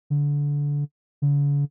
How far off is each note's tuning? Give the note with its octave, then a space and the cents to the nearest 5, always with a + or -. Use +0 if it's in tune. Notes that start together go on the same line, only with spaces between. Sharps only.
D3 -20
D3 -45